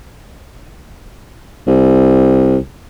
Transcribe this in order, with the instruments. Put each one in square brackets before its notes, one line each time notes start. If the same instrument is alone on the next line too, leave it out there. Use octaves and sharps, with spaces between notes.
[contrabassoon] C2